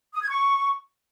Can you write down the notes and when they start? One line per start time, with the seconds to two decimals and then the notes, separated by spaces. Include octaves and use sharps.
0.14 D#6
0.22 G#6
0.29 C#6